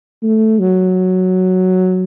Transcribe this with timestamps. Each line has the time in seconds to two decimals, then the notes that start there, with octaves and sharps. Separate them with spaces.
0.22 A3
0.59 F#3